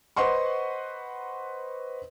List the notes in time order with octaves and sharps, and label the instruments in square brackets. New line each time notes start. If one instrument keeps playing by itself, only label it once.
[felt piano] B4 C5 D#5 F#5 C6 C#6